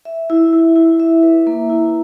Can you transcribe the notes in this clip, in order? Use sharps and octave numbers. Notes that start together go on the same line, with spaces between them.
E5
E4
E4
E4
E5
B4
A#3
E4